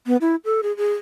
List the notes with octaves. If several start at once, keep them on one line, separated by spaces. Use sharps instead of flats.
B3
E4
A4
G#4
G#4